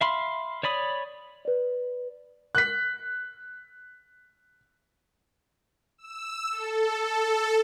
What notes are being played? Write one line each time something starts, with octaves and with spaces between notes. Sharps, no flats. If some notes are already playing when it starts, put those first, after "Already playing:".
E5 F5 B5 C6
C#5 D5 B5 D#6
B4 D5
F#6 B6
E6
A4
A4